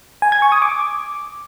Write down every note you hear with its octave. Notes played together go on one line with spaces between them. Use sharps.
G#5
G#6
C#6
D#6
D6